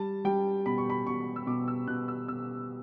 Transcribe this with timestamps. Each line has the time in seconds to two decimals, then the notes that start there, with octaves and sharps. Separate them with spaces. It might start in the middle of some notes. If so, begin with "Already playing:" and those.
Already playing: G3 A5
0.25 G3 G5
0.66 B2 B5
0.78 C#6
0.90 B5
1.06 B2 C#6
1.36 E6
1.47 B2 D6
1.68 E6
1.88 B2 F#6
2.08 E6
2.28 B2 E6